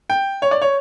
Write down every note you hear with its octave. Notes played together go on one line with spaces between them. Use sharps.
G5
C#5
D5
C#5